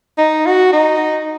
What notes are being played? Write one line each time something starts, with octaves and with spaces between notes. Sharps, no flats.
D#4
F#4
D#4